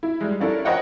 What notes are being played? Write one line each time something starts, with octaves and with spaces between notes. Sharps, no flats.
E4
G3 G#3
C#4 D4 E4 A4 A#4
A#4 C5 C#5 D#5 F#5 G5